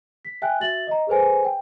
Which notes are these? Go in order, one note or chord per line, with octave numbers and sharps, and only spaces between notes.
B6
E5 G5 G#5 F#6
F#4 E5 A6 F#7
D#5 A#5
G#4 A4 B4 C5 G#5
G5